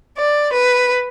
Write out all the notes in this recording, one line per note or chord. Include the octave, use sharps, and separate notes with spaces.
D5
B4